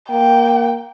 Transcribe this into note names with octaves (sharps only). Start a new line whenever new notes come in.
A#3 G5